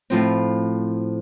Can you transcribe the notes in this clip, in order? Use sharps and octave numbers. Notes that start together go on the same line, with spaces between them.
A2 F3 C4